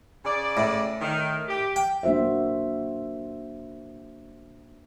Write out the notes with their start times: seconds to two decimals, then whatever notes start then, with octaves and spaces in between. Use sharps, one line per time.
0.25 C#3 D5
0.57 A2
1.01 D#3
1.48 G4
1.76 G5
2.03 A#3 D4 F#4 C5 E5